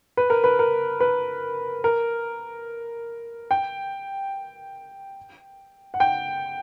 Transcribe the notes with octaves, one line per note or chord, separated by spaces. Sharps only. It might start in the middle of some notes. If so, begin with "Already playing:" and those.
B4
A#4
B4
A#4
B4
A#4
G5
F#5
G5